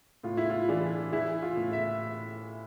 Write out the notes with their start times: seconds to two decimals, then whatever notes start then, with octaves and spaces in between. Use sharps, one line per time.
0.23 A2 F4
0.37 E4
0.50 F4
0.69 E3 D4
1.12 E3 E4
1.43 F4
1.57 A2
1.73 E5